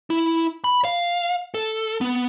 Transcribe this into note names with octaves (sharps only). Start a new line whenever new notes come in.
E4
B5
F5
A4
B3